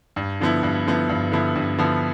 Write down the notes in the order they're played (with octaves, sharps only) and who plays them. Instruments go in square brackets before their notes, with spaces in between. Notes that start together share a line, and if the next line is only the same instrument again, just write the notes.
[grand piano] G2
D3 F3 B3 E4
G2
D3 F3 B3 E4
G2
D3 F3 B3 E4
G2
D3 F3 B3 E4